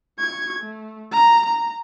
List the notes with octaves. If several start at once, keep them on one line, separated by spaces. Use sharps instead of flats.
C#6 G#6
A3
A#5
A#5